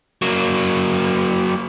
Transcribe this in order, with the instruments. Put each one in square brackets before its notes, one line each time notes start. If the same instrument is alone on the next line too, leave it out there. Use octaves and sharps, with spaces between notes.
[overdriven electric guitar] F#3 A#3